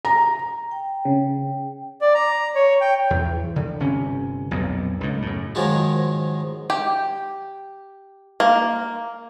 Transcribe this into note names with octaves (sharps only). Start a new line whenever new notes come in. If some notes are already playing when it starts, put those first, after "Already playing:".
A#5
G5
C#3
D5
A#5
C#5
G5
E2
D3
G1 C3 C#4
B1 F2 A#2
C#2 A2
F#2 A2
G#2 D#3 F3 F#3 G#3 D#4
G4
A#3